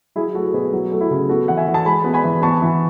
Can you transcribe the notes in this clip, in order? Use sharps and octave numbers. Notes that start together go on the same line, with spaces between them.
F#3 E4 G#4
A3 F#4 A4
A4
B2 G#4 B4
F#3
A3
E4
C#3
B3 F#4 A4
E3 F#5
E5 G#5
E3
A5
G#3 G#5 B5
B3
G#5 B5
E3
B3 A5 C#6
E3